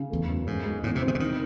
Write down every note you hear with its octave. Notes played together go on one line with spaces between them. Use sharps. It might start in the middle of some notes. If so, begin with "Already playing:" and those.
Already playing: C#3
E2 A3
F#2
G#2 G#3
G#3
E2 A2
C3
C4
D#3
C#3
D#3 D#4